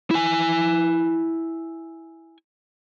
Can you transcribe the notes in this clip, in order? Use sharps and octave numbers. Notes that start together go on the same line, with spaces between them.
E4 G#5